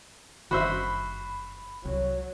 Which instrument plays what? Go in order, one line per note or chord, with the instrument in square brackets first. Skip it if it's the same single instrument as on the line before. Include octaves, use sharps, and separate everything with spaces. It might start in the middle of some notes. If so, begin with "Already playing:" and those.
[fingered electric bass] F#1 G2 D#3 [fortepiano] F#4 C5 E5 [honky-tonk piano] B5
[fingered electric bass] C2 [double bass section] F#3